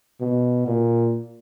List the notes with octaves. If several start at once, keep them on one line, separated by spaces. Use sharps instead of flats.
B2
A#2